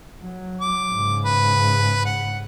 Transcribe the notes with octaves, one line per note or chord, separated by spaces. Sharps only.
F#3
D6
G#2 C#3
B4
F#5